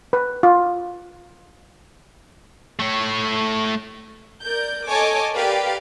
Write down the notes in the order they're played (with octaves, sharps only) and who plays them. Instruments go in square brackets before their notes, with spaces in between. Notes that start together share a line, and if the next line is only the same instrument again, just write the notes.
[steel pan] B4
F4
[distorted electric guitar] A3 C#5
[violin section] A#4 D5 G6
A4 C#5 D#5 G#5 A5 D6
G4 A#4 B4 D5 F5